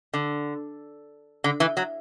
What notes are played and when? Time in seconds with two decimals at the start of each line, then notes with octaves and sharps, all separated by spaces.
0.14 D3
1.44 D3
1.60 E3
1.77 F#3